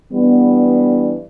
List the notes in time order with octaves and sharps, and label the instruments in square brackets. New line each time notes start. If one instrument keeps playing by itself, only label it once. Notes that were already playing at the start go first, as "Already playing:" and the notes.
[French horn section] E3 G3 B3 D4